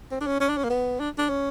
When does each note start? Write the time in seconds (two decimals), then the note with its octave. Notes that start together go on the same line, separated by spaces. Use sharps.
0.11 C4
0.21 D4
0.26 C#4
0.41 C#4
0.49 D4
0.57 C#4
0.64 A#3
0.70 B3
1.00 D4
1.18 D4
1.29 C#4